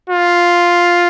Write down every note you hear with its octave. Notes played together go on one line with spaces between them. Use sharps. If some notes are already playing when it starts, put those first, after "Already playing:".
F4